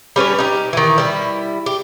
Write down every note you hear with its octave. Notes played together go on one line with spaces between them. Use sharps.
G3 C#4 B4 C#5
D#4 G4
D#3 E3
G3 E4
G4